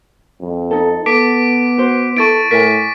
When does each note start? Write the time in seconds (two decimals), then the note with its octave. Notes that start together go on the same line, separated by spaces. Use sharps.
0.40 F2
0.71 D#4 A4
1.06 B3 A4 D6 B6 D7
1.78 F#4 C5
2.17 E4 A4 C#6 A6 D7
2.51 A2 A#4 G#5 B6